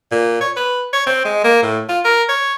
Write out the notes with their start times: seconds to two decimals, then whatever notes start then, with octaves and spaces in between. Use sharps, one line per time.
0.12 A#2
0.40 C#5
0.56 B4
0.93 C#5
1.07 C4
1.25 G#3
1.44 A#3
1.62 A2
1.89 F4
2.05 A#4
2.29 C#5